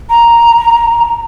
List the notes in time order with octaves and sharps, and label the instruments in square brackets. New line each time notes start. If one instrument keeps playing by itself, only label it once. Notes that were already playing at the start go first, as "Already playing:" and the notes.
[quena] A#5